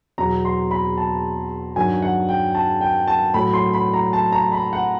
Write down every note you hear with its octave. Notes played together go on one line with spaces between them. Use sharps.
E2 B2 F#3 A#5
C6
B5
A5
G2 D#3 F#3 G#5
F#5
G5
A5
G5
A5
A2 F#3 B5
C6
B5
A#5
A5
A#5
B5
F#5